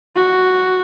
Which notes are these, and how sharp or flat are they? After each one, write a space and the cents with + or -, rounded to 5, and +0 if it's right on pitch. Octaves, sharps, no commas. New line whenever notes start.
F#4 +0